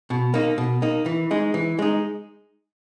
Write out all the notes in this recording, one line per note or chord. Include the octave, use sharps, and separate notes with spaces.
B2
A#3 D#4
B2
A#3 D#4
E3
G#3 D#4
E3
G#3 D#4